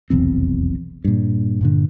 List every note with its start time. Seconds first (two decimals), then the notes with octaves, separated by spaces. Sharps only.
0.10 F1 B1 E2 C4
1.04 G2 A#2
1.61 G2 A#2 D3